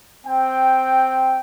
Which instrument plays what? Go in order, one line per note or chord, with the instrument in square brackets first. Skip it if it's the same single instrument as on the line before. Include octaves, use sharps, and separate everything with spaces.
[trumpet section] C4 G5